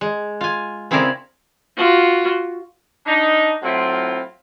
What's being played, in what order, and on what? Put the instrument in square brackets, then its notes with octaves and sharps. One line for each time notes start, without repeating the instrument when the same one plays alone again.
[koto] G#3
F4 G#5
C#3 C4 E4 G#4 A#4 D5
[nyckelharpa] F4 F#4
[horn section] D4 D#4
A2 F#3 C4 E4 F4